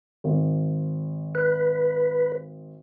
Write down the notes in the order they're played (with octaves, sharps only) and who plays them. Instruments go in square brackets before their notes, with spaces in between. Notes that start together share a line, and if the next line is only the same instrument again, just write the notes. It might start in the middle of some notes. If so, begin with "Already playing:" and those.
[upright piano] G#1
[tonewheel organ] B4